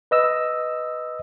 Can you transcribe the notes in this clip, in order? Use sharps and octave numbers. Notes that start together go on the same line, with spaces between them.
B4 D#5 E6